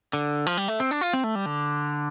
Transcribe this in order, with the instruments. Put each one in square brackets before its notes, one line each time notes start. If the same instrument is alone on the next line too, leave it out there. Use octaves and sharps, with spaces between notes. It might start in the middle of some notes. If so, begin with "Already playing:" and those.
[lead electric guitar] D3
F3
G3
A3
C4
D4
F4
C4
A3
G3
D3